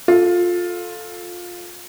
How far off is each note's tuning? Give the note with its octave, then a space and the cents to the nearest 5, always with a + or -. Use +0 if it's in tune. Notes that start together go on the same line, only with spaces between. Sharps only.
F4 +15 A4 +0